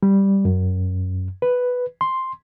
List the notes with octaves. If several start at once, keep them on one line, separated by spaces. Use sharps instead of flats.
G3
F#2
B4
C6